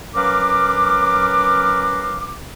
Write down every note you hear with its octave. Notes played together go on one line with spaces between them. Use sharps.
F#3 C#4 A#4 B4 F5 D6